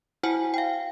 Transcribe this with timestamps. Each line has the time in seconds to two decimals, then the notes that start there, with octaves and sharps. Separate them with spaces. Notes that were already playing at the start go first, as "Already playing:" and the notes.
0.23 E4 F#4 C5 F#5 G#5
0.54 F5 G5